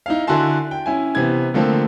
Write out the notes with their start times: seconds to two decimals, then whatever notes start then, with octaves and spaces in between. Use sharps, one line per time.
0.06 D#4 E4 F5
0.27 D3 E4 F#4 G#5 A5 C6
0.71 G5
0.86 C#4 E4 G#5
1.15 C3 E3 B3 G#6
1.54 D3 F3 A3 A#3 C4